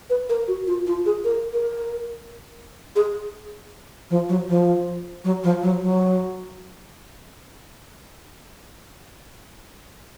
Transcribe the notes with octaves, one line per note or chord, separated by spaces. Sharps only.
B4
A#4
F#4
F4
F4
G#4
A#4
A#4
G#4
F3
F#3
F3
F#3
F3
F#3
F#3